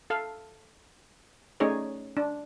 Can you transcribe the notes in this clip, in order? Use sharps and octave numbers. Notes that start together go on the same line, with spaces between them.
A4 F5
A3 C#4 D#4 G#4 C#5 D5
D4